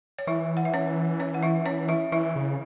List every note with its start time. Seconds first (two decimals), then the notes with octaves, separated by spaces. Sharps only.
0.19 C#5
0.27 E3 E4 E5
0.57 F#5
0.65 E5
0.74 C#4 C#5
1.20 C#4 C#5
1.34 F#5
1.43 E4 E5
1.66 C#4 C#5
1.89 E4 E5
2.12 E3 E4 E5
2.36 C#3